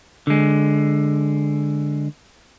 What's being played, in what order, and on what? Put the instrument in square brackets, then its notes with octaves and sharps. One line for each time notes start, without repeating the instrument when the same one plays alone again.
[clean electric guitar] D3 G#3